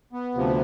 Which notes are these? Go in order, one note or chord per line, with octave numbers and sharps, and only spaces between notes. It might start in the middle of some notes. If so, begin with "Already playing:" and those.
B3
D2 C3 F3